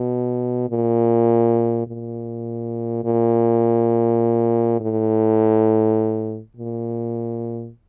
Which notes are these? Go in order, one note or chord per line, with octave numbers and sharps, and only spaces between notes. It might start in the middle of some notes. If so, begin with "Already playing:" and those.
Already playing: B2
A#2
A#2
A#2
A2
A#2